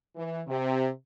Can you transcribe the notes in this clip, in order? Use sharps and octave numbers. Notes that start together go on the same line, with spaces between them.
E3
C3